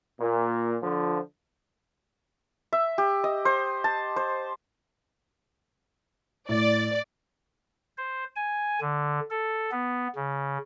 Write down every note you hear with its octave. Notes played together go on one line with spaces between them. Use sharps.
A#2
D3 F3
E5
G4
D#5
C5
A5
C5
A2 D5
C5
G#5
D3
A4
B3
C#3